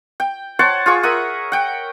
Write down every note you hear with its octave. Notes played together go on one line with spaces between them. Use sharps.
G5
C5 C#5 F#5 A5
F4 G#4 C#6
A#4 E5 F#5 D#6
F#5 G5